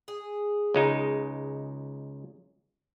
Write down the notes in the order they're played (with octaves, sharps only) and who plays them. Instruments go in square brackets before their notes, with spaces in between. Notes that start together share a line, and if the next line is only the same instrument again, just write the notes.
[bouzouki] G#4
[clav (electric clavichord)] C#2 G#3 D#4